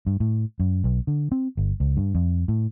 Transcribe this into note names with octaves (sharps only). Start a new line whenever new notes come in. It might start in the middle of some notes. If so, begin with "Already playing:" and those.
G2
A2
F#2
B1
D3
C4
G1
C#2
G2
F2
A2